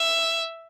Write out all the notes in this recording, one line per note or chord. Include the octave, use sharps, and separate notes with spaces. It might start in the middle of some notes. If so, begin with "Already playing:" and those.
Already playing: E5